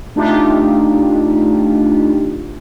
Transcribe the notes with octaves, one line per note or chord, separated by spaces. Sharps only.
A3 D4 D#4 F4 G4